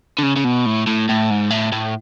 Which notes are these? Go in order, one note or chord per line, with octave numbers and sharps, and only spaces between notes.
D3
C#3
C#3
B2
A2
A2
A2
G#2
A2
A2